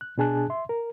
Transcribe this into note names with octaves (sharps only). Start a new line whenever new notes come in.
F#6
B2 D4 G#4 G#5 A5 F#6
E5 C6
A#4